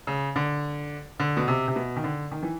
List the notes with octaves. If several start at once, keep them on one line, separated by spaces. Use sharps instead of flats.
C#3
D3
D3
B2
C3
C3
B2
D#3
D3
D#3
E3